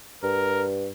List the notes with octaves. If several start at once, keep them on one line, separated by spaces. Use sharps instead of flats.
G2 A#4